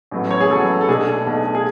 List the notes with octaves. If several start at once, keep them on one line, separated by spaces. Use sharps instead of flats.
A1 A2 F#3 B3
C#5
G#4
A1 A2 F#3 B3 A4
A4
B1 B2 A3 D4 G#4
B1 B2 A3 D4
G#4